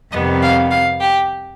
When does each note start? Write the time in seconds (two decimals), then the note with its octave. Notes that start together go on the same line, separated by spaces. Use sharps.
0.12 F2 C3 D#3 G3 B3 D#5
0.42 F5
0.71 F5
1.00 G4